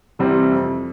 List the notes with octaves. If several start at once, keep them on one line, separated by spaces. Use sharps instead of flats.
C3 E3 G3 C4
F2